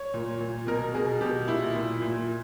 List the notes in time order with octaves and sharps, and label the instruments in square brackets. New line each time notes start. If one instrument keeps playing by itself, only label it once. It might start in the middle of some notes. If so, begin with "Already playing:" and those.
Already playing: [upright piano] C#5
A#2
A#2
B2 A#4
B2 G#4
B2 G4
A#2 E4
A#2
A#2